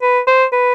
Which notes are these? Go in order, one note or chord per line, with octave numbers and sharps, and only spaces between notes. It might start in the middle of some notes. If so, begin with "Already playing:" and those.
B4
C5
B4